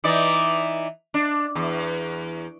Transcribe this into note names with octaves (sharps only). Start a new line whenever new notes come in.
E3 D#4 D5
D4
E2